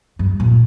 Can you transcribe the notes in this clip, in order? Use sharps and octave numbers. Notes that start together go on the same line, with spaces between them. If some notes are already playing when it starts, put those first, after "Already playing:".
G2
A#2